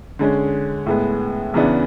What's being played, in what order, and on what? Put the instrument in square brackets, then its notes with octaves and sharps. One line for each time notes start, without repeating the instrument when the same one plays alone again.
[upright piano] D3 G#3 C#4
A2 G#3 B3
E2 C#3 E3 B3 D4